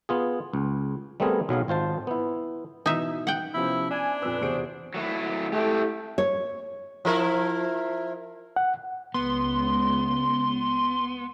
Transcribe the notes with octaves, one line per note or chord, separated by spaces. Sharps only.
B3 F4 G#4
C#2
G3 A3 B3 C4 G#4 A#4
B1 F#3 G#4 F5
G#1 F4 C5 A5
B3 E4
B2 E3 D#4 E5
F#5 G5
C3 F3 B3 C#4 E4 F4
D4 G#5
F2 A#2 C4 B4 E6
E2 C3 F#4 G#4 C5 D7
F#3 A3 E4
A3 E4 G4
C#5
F3 E4 A#4
F#5
C#2 B3 C6